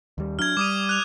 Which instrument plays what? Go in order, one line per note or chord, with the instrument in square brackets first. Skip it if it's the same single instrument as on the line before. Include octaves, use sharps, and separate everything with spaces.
[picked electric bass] D#2 G3
[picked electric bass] F#3 D4 [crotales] F6 G#6
[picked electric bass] G3 [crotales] D6 D#6 D#7
[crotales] F#6 F7